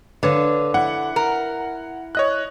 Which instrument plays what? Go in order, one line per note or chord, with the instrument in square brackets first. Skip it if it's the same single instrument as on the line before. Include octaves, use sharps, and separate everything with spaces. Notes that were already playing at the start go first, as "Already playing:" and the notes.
[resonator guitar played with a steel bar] D3 [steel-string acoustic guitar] B4 C#5 F5
[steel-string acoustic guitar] E4 [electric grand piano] F#5 F#6
[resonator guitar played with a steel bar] A#4
[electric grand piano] C#5 D#5 F#6